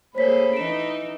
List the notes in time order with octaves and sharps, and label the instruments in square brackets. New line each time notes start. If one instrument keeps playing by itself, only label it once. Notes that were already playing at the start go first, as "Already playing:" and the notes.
[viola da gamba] A#3 G#4 A4 [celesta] C5 C#5 B6 [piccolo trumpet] B5
[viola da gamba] E3 D#4 [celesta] D7 E7